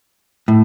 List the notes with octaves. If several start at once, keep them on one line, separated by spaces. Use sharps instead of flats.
A2